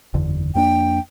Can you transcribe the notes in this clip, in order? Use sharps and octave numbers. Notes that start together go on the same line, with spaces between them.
F#1 E2 D3
F2 A#3 D4 G5